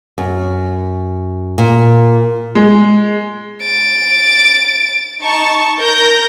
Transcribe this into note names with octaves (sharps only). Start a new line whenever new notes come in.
F#2
A#2
G#3
A6 D7
D#4 A5 C#6 C#7
A#4 G6 A#6